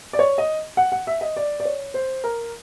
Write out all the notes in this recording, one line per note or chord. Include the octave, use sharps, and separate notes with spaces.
D5
C#5
D#5
F#5
F#5
E5
D#5
D5
D5
C#5
C5
A#4